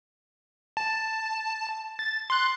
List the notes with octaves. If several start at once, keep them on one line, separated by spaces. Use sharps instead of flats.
A5
A6
C6 F#6